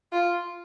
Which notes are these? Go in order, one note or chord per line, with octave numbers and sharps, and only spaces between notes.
F4